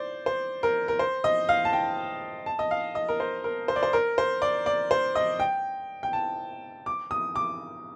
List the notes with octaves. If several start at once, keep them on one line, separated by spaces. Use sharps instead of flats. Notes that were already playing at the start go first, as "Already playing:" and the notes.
Already playing: C5 D5
C5
A#4
A#4
C5
D#5
F5
A5
G5
A5
D#5
F5
D#5
A#4
C5
A#4
C5
D5
C5
A#4
C5
D5
D5
C5
D#5
G5
G5
A5
D6
D#6
D6